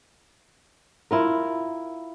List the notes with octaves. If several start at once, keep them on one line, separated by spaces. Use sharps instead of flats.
E4 F4 A#4